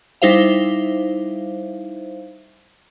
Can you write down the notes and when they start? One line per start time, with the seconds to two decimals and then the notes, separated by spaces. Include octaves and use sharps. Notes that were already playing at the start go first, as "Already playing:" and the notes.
0.22 G3 D#4 E4 C5 E5 F5